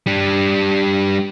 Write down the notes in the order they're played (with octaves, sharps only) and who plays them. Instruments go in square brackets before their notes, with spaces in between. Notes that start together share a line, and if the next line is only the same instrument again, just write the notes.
[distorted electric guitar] G3 D4